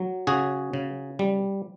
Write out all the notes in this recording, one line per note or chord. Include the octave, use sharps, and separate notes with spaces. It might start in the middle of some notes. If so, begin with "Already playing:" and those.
Already playing: F#3
C#3 F#4 G#4
C#3
G3